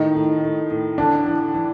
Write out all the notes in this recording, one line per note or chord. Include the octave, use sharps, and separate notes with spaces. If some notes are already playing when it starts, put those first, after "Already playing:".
Already playing: A2 D#3 D#4
A2
A2
A2
D3 E3 D4
E3
E3